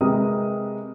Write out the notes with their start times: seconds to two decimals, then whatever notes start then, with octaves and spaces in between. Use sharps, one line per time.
0.01 C3 G#3 G4 A#4 B4 D#6